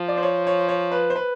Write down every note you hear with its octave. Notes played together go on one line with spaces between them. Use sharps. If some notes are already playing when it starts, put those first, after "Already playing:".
Already playing: F3
D5
C5
C#5
C#5
C#5
B4
C5
B4